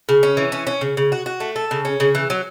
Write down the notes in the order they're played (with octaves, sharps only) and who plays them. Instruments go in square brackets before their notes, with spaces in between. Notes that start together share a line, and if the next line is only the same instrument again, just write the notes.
[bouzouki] C#3
C#4
E3
C#4
C#4
C#3
C#3
F#4
F#4
A3
A4
C#3
C#4
C#3
E3
F#3